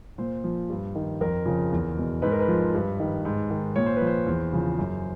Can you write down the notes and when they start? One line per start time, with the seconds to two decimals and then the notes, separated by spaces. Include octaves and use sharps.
0.18 A#2 C5
0.44 F3
0.70 G2
0.95 D#3
1.21 F2 A#4
1.46 C#3 F3
1.72 E2
1.97 B2
2.22 G#2 B4
2.32 A#4
2.40 B4
2.48 F3
2.74 G2
3.00 D#3
3.25 G#2
3.50 D#3
3.76 A#2 C#5
3.86 C5
3.97 F3 B4
4.07 C5
4.27 E2
4.53 C#3 F3
4.79 F#2